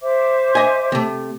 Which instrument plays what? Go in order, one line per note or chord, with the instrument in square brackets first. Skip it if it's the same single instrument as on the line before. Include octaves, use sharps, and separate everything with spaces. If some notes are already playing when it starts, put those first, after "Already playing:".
[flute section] C5 E5 D6
[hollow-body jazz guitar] D#5 G#5
C3 A3